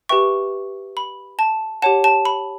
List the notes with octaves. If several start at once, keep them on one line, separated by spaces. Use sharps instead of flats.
G4 B4 E5 G5 C#6
B5
A5
G4 C#5 F#5 A5
A5
B5